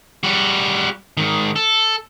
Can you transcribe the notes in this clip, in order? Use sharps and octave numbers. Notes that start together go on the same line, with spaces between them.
G3 F#4
G#2 D#3
A4